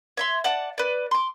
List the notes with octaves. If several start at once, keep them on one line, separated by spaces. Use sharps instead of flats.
C#5 E5 C6
D5 F#5 A5
B4 D5
C6 D6